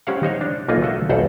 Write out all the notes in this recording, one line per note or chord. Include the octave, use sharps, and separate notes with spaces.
G#3 C#4 G4 C5 F5 F#5
D#4 C5 C#5
D4
B1 A#3 D#4 F4 G#4
A3 F#4 D#5 E5
B1 E2 G4 A4 C5 F#5